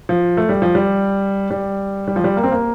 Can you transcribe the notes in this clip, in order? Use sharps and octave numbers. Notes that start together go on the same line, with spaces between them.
F3
A3
G3
F3
G3
G3
G3
F3
G3
A#3
C4
A#3